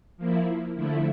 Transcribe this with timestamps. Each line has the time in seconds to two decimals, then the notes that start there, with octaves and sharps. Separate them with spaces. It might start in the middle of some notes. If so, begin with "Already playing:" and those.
0.17 F3 A#3 E4
0.75 D3 F3 A3 E4